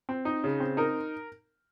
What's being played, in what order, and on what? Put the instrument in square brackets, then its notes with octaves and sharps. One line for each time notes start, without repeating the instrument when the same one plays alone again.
[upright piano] C4
D#4
C#3
C4
D#4 A#4